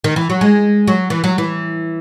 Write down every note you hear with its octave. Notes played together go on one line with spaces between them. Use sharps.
D#3
E3
F#3
G#3
F#3
E3
F#3
E3